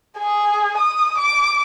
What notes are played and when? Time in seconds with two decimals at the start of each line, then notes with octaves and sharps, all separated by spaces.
0.17 G#4
0.77 D#6
1.18 D6